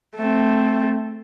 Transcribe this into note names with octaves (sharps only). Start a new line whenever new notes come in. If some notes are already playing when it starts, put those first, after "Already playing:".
A3 C4